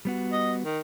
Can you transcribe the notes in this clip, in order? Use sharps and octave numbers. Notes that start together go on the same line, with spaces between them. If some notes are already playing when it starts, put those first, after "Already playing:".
G3 B3 F#4
D#5
D#3